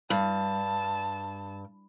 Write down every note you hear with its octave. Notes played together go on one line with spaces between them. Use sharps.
G2 A5